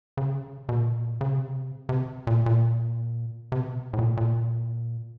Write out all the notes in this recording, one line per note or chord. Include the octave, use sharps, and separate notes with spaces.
C#3
B2
A#2
C#3
C3
C3
A#2
A#2
C3
B2
A2
A#2
A#2